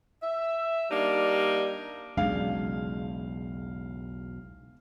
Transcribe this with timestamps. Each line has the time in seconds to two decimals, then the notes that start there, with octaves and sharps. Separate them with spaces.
0.23 E5
0.91 G3 A#3 D4 D#4
2.17 B1 E2 C#3 G#3 D4 F5